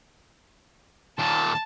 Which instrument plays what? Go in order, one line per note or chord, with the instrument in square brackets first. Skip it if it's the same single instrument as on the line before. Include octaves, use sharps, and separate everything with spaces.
[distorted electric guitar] D#2 A#2 [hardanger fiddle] A5